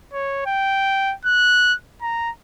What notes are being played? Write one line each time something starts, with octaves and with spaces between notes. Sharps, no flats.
C#5
G5
F#6
A#5